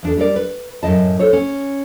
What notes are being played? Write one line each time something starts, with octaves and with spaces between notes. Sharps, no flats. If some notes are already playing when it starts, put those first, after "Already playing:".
E2 D4 A4
G3 D4 A#4 D5
B4
F#2 A2 D#3 D#5 A5
A4 C5 C#5
C#4